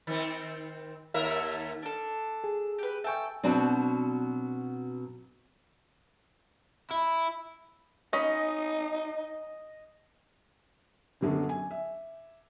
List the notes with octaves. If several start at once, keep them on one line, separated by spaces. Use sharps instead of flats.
D#3 C4
D#2 A#4 E5
D4 A4
G#4
G4 B4
A4 E5 G5 G#5 C#6
B2 F#3 C4 D4
E4
C#4 D#4 D#5 B5
F#2 D3 F#3 B3 C#4
G#5
E5